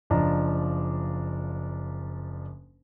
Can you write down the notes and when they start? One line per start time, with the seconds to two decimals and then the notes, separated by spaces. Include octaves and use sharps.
0.10 F#1 F3 D4 D#5 A#5